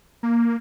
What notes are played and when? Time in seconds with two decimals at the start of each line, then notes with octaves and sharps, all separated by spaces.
0.23 A#3